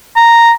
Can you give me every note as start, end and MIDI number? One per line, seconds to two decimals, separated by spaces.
0.16 0.51 82